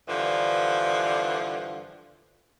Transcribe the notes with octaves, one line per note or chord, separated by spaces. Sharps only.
G2 D3 E3 F3